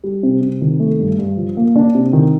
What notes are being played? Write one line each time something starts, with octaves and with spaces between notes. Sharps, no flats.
G3
C3
C3
D#3
A3
G2
G2
F3
A#3
D4
C3
D#3